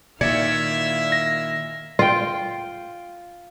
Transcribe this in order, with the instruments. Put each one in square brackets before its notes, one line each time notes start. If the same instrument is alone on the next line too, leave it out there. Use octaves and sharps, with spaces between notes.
[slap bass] A#2 D#3 [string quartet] E4 E5 F5 [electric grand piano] D5 G#6 C#7
[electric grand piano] A#6
[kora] F4 G5